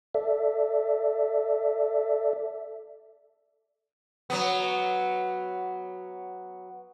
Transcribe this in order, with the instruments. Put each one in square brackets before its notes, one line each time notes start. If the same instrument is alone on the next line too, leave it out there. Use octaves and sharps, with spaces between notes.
[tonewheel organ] A4 D5 E5
[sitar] F#3 B3